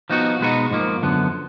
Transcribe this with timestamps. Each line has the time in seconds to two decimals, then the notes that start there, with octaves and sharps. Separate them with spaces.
0.10 F3 B3 D#4 F#4
0.40 B2 G#3 B3 D#4 F#4
0.71 G#2 F3 A#3
1.02 F#2 D3 F3 B3